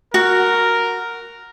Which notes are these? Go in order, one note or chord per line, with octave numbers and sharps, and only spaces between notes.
F#4 A#4